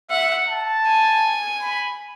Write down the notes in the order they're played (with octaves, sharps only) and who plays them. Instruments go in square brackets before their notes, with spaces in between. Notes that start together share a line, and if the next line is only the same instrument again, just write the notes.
[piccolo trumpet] E5 [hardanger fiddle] F#5
[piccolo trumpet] A5
[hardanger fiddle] G#5
[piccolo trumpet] B5